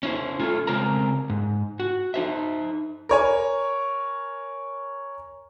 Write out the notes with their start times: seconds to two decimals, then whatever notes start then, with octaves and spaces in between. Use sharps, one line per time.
0.03 C#4 E4 C5
0.40 A3 C#4 F4
0.67 C#3 G#3 C4 A#4 A#5
1.30 G#2
1.80 F#4
2.14 D#4 C5 E5
3.09 A#4 C#5 G#5